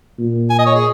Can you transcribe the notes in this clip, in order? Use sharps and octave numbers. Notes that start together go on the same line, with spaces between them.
A#2
G#5
D#5
C#5
G#4